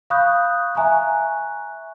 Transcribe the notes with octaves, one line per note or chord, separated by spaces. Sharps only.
F5 B5 C#6 D#6 F#6 G6
E5 G#5 A#5 C#6 F#6